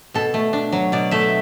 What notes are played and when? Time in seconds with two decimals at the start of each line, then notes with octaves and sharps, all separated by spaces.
0.14 B2 A4
0.34 A3
0.53 D4
0.72 F#3
0.92 B2 D5
1.11 A3 E5